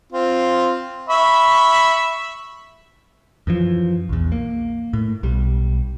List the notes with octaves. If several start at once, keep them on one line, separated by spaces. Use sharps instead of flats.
C4 F4
E5 B5 C#6
F#2 E3 F3
A#1 E2
A#3
A2
B1 G3